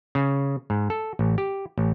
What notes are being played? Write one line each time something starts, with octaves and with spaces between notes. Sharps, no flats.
C#3
G#2
A4
A1
G4
A1